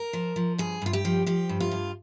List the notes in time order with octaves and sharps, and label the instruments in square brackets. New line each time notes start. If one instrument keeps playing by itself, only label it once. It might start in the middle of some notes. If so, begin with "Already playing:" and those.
Already playing: [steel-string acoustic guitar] A#4
F3
F3
G2 G#4
G2 F4
G4
F3
F3 G4
G2
F4
G2